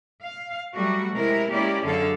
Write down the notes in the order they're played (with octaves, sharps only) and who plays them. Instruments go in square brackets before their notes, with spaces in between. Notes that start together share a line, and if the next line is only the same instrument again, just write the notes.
[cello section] F5
F#3 G3 A3 F#4
C3 G#3 E4 A#4
G#3 A#3 C#4 E4 G4 D5
F#2 D3 G#4 A4 F5